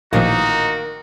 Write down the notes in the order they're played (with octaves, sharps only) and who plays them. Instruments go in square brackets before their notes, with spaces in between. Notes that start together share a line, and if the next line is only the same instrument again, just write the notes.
[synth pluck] A1 A#2 F3 [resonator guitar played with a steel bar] D#3 A#3 [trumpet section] D#4 [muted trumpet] F#4